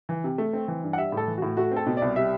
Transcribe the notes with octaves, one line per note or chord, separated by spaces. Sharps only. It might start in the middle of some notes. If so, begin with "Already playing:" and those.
E3
C3
A3
C4
E3
G2
F#5
G3 E5
A2 A4
E3
A2 F#4
A3 F#4
C4
A4
B2
C2 D5
G3 E5